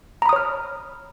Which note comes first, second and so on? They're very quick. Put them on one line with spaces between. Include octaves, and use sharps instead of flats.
A#5 B5 D#6 C#5 F6